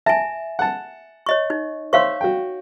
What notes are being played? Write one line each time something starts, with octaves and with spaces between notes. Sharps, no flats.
E5 G#5 A5
F#5 A5
C#5 D#5 C#6
D#4
C5 C#5 E5 F5 C6 C#6
F#4 G5